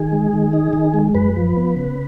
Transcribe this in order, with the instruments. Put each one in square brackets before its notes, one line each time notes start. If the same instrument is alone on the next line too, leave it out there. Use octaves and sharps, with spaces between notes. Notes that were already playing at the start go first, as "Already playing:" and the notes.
Already playing: [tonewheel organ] D#3 G#4
G#3
D#3
D#4
D#3
G#3
F#2 B4
F3
B3
C#3